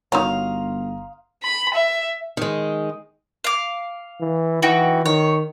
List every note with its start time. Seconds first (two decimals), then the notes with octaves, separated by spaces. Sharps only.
0.12 G1 D#4 F#4 C#5 F5 A#5 C6 D#6
1.43 B5
1.74 E5
2.37 D#3 G#3
3.44 F5 D6
4.21 E3
4.62 E3 D#4 F#4 G5
5.06 D#3 C#5